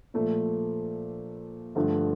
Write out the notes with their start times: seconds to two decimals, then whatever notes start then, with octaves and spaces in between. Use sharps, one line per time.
0.14 A#2 F3 A3
1.75 G2 D3 F3 A3